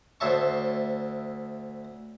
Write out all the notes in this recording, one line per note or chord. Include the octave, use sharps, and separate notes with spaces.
D2 C5 C#5 E5 A5 C#6